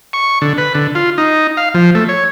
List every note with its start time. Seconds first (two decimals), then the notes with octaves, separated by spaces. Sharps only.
0.13 C#6
0.42 D3
0.58 B4
0.75 D3
0.95 F4
1.18 D#4
1.57 F5
1.74 F3
1.95 A3
2.09 C#5